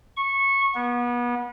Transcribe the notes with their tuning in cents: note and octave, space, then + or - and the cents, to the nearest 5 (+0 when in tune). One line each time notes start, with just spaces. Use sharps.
C#6 -15
B3 -30